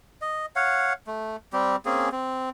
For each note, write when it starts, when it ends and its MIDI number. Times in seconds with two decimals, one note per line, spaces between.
0.22 0.46 75
0.56 0.93 73
0.56 0.93 77
0.56 0.93 78
1.07 1.36 57
1.53 1.76 55
1.53 1.76 60
1.53 1.76 67
1.86 2.09 58
1.86 2.09 60
1.86 2.09 61
1.86 2.09 68
2.12 2.50 60